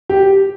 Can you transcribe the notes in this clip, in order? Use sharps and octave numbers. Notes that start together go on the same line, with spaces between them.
G4